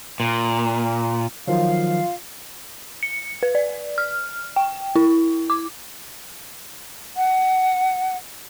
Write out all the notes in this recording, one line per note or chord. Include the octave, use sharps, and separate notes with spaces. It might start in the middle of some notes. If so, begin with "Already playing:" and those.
A#2
D#3 F3 F#3 F4 F5
C#7
B4
D5
F6
G5
E4
D6
F#5